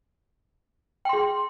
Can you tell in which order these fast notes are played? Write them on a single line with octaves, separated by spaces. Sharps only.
G5 C6 G#4